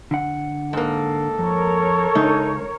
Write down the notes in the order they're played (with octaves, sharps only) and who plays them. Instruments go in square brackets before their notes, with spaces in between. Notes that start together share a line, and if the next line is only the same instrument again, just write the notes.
[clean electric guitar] D3 F#5
[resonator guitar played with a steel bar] G#2 A#3 [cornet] A4
[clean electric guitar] F2 [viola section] A#4 C#5
[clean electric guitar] C#3 G#3 [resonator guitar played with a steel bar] D#4